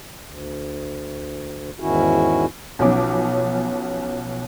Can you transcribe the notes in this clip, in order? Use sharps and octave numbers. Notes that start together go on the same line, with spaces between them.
D2
E2 G#2 D#3 C#4 E4 F#4
B1 B2 F3 F#3 C#4 D6